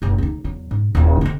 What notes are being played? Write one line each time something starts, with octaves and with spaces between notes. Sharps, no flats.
F#1 B1
D2 D#4
E2 F#3
G#2
D#1 F4
D3 C4